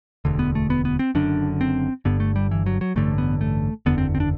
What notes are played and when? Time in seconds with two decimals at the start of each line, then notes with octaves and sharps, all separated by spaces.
0.25 E1 D2 D3
0.39 B3
0.55 A3
0.70 B3
0.85 B3
0.99 C4
1.15 F#1 F#2 D3 D4
1.61 C4
2.05 G1 G2 D3 B3
2.20 A3
2.36 G3
2.51 E3
2.66 F#3
2.81 F#3
2.96 A1 G2 D3 A3
3.18 B3
3.41 A3
3.86 F#1 E2 D3 B3
3.98 C4
4.15 C4
4.20 D4